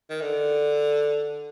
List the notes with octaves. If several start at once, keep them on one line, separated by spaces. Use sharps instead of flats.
D#3
D3